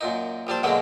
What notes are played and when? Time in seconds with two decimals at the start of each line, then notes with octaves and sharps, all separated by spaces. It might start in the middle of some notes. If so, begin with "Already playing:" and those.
0.01 F#2 A#2 D#4
0.47 A#1 G3 D4 C5
0.63 F#2 B2 D3 F#3 G#3 A#3